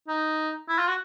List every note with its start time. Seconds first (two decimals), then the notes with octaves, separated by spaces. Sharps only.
0.08 D#4
0.68 E4
0.78 F4
0.88 F#4